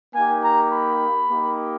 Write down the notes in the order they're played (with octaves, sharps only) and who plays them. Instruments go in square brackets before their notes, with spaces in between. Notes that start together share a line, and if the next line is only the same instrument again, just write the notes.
[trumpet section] A#3 D#4 G4 G#5
A#5
B5
A#3 D#4 G4